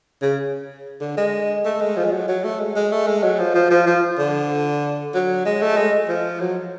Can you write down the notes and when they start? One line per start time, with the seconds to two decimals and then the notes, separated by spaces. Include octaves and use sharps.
0.22 C#3
1.01 D3
1.17 G#3
1.65 A3
1.81 G#3
1.97 F3
2.05 G#3
2.12 F#3
2.28 F#3
2.44 A3
2.60 G#3
2.76 G#3
2.92 A3
3.07 G#3
3.23 F#3
3.39 F3
3.55 F3
3.71 F3
3.87 F3
4.19 D3
5.14 F#3
5.46 G#3
5.62 A3
5.77 G#3
6.09 F3
6.40 F#3